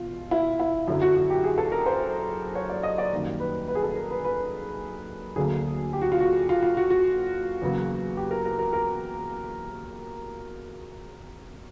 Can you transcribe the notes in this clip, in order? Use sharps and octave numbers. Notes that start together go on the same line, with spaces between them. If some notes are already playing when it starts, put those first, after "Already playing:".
Already playing: E2 B2 F4
E4
E4
F#2 D3 F#3 E4
F#4
F#4
G4
G#4
A4
A#4
C5
C#5
D5
D#5
D5
F#2 D#3 G3 A#3
B4
B4
G#4
A4
A#4
B4
B4
D2 D3 F#3 A#3 G#4
G4
F#4
F4
F#4
F4
F4
F#4
F#4
E2 C#3 F#3 A#3
G4
A#4
A#4
A#4
A#4